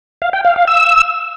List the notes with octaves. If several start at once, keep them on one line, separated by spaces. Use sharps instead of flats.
F5
G5
F5
F5
E6